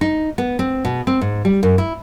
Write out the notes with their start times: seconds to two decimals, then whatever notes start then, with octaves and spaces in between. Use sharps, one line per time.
0.01 D#4
0.38 B3
0.59 C4
0.85 B2
1.07 C4
1.21 G#2
1.45 G3
1.63 F#2
1.78 E4